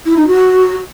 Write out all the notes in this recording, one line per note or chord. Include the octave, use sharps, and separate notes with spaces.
E4
D#4
F#4